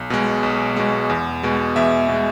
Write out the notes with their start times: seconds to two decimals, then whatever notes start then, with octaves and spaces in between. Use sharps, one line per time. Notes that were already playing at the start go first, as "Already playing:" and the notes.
Already playing: B1
0.10 B2 G#3
0.43 B1
0.77 B2 G#3
1.10 E2
1.43 B2 G#3
1.76 E2 E5
2.09 B2 G#3